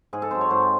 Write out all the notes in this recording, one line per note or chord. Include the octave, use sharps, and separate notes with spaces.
G#2 G#4
A4
F#3 C4 C5
C#5
G#2 C5